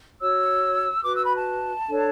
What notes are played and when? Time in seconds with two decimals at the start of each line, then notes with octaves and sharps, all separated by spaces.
0.20 F#4 C#5 E6
1.05 F#4 B4 D6
1.15 E6
1.25 B5
1.36 A5
1.90 D4 A4 C#5